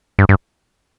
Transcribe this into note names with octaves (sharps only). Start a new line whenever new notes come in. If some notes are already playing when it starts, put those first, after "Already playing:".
G2
G2